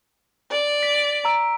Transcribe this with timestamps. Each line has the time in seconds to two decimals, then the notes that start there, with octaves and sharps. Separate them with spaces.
0.51 D5
0.83 B6
1.25 A#5 E6 D7